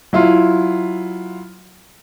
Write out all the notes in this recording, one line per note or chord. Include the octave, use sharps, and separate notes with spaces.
F#3 E4 F4